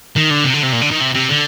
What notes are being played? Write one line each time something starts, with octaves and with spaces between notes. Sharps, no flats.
D#3
D3
C3
D3
C3
A#2
D3
D#3
C3
C3
D3